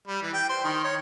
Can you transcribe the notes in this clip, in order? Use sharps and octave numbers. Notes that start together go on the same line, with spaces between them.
G3
E3
G5
C5
D#3
C#5